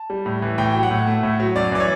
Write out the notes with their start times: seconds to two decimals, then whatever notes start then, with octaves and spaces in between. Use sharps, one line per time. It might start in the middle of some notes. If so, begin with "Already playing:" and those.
Already playing: A5
0.10 G3
0.26 A2
0.42 E3
0.58 A2 G5
0.74 F#3
0.83 F#5
0.91 A2
1.07 A3
1.23 A2
1.40 F#3
1.55 F#2 D5
1.72 E3 D5
1.80 C#5